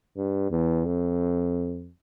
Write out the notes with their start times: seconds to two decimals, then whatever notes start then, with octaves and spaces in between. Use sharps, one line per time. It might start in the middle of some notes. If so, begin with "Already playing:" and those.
0.17 G2
0.51 E2
0.85 F2